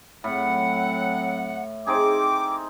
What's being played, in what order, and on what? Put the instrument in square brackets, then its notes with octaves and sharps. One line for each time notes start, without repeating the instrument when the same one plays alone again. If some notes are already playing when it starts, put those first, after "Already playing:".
[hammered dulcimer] A2 [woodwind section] F#3 C4 F#5
[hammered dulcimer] C4 D#4 G#4 [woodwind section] G5 D6